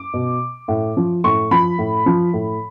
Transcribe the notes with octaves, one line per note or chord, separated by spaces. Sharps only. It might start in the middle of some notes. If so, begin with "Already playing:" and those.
Already playing: D6
B2
A2
F3
A2 C#6
F3 B5
A2
F3
A2